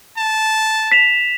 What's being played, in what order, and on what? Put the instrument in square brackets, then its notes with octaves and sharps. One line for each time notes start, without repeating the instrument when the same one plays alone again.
[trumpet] A5
[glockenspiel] B6 E7 F7